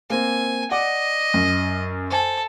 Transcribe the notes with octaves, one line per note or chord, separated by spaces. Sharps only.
A#3 C4 G#5
D5 D#5 F#5 D6
F#2
A4 C5 G#5